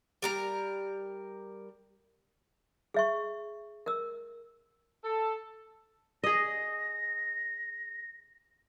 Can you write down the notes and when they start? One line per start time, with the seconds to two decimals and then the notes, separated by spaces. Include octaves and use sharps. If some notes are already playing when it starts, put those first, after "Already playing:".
0.22 G3 A#4 A#5
2.94 G#4 E5 C#6
3.86 A#4 E6
5.03 A4
6.24 G#4 D#5 A#6